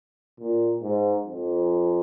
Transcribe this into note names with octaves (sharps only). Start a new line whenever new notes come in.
A#2
G#2
F2